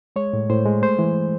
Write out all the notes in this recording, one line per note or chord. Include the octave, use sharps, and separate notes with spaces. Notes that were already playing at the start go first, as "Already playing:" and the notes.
G#3 C#5
A2
A2 C5
G#3
A3 C5
E3